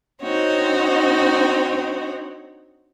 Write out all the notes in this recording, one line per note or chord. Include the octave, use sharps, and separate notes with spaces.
C4 D4 D#4 F#4 C#5